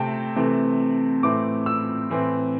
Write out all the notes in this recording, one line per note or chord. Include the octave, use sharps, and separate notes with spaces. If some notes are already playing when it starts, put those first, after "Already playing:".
Already playing: C3 A3 C4 G5 A5
C3 E3 A3 C4
A2 E3 A3 C4 D6
E6
A2 E3 C4